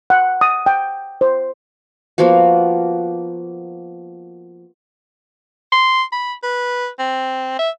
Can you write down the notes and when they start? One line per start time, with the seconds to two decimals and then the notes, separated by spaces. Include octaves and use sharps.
0.10 F#5
0.41 D#6
0.66 G5
1.21 C5
2.18 F3 A#3 B3 F#4
5.72 C6
6.12 B5
6.43 B4
6.99 C4
7.59 E5